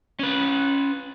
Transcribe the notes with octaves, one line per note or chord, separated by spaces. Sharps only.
C#4 B4